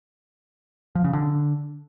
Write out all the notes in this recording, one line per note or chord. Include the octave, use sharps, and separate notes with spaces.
F3
C#3
D3